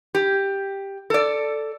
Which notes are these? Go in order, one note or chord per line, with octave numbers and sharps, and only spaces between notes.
G4
A4 D5